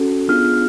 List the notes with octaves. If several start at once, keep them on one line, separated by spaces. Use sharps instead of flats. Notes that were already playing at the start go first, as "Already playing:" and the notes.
Already playing: C#4 F#4 A4
B3 D4 F4 G#4 F6